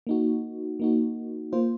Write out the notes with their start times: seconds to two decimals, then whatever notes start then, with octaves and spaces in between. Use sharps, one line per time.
0.07 A#3 D#4 F#4
0.80 A#3 D#4 F#4
1.53 A#3 F4 C5